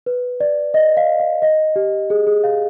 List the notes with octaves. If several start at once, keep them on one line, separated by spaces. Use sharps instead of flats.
B4
D5
D#5
F5
F5
D#5
G4
G#4
G#4
F5